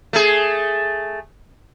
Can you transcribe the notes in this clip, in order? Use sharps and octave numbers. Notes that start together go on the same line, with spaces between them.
A3 G#4